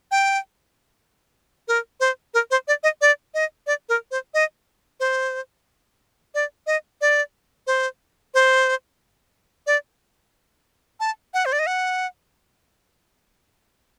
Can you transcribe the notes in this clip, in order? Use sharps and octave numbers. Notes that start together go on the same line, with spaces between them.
G5
A#4
C5
A#4
C5
D5
D#5
D5
D#5
D5
A#4
C5
D#5
C5
D5
D#5
D5
C5
C5
D5
A5
F#5
C5
D5
D#5
F#5